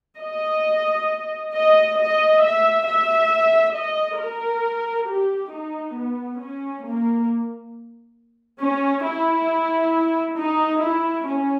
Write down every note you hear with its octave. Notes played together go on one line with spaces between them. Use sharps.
D#5
D#5
D#5
E5
E5
D#5
A#4
G4
D#4
B3
C#4
A#3
C#4
E4
D#4
E4
C#4